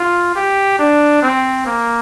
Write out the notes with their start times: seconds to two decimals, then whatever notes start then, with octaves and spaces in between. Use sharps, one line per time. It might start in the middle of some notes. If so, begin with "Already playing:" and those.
Already playing: F4
0.35 G4
0.79 D4
1.22 C4
1.66 A#3